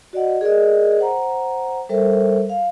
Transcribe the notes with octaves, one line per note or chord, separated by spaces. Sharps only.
F#4 D5 D#5 F#5
G#4 A#4 D5 D#5
C5 F#5 A#5
G3 A4 A#4 C5 E5
F5